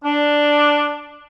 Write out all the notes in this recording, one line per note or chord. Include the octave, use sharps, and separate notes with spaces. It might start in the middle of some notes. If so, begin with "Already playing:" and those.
D4